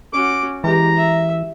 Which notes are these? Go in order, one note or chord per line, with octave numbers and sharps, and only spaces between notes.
C#4 F#4 D6
E3 G#3 G4 A#5
E5